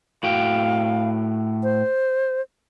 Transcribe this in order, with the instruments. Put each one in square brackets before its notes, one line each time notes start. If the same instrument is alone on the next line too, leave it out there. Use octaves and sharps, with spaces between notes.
[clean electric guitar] A2 F#4 G5 [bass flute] F5
[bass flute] C5